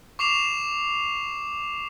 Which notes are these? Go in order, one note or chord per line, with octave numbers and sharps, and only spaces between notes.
C#6 D6 C7 E7 F7